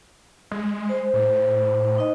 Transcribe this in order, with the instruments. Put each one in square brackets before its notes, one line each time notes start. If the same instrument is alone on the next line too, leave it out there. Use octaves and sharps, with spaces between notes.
[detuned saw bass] G#3
[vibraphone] C5
[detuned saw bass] A2
[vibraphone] D#4 D#5